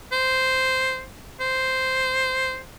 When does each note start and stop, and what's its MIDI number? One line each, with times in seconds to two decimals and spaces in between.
0.12 1.03 72
1.40 2.60 72